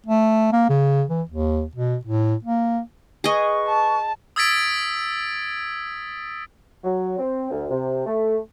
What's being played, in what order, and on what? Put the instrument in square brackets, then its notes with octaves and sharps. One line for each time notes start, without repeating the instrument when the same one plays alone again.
[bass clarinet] A3
A#3
C#3
E3
D#2
B2
A2
A#3
[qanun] G#4 D#5 [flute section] B4 C#6
[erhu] A5
[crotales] D#6 E6 G#6 A6 B6 D7
[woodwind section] F#3
C4
D2
C3
A3